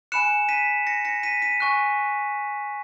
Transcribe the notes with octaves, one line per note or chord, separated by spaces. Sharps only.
G#5 B5 F#6 C#7 E7
B6 D#7
A#6 C#7
A#6 C#7
B6 D#7
B6 D#7
G#5 C#6 F#6